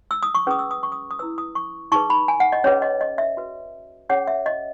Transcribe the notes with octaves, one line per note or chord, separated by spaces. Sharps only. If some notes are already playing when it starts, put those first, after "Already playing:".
E6
D#6
C#6
C#4 G#4 B4 D#6
E6
D#6
C#6
D#6
D#6
E4 B4 E6
D#6
C#6
D#4 G#4 B4 C#6
B5
G#5
F#5
D#5
C#4 G#4 B4 C#5
D#5
D#5
E5
F#4 B4
C#4 G#4 C#5 F#5
E5
D#5